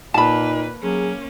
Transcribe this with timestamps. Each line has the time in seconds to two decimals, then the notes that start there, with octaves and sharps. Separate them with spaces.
0.14 A#2 A#3 D#4 B4 A5 B5
0.83 F#3 A#3 C#4 G#4